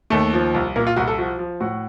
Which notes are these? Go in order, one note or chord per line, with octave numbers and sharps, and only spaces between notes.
D#2 A3
F3
C2
A#2 A#3
F4
C2 F#4
A4
F3 F#4
F3
A2 F#4